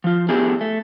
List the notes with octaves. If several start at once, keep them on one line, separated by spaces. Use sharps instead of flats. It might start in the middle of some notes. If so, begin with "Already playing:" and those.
F3 F4
A3 B3 D4 E4 G4 G#4
A3